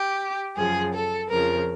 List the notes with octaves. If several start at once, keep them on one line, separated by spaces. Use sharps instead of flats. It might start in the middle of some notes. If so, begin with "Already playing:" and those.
Already playing: G4
F#2 C#3 F3 G#4
A4
F2 C#3 F3 A#4